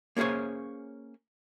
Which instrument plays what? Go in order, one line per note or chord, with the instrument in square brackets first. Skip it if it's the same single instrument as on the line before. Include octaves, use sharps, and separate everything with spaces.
[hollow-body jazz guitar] A#3 C#4 G#4 C5 C#5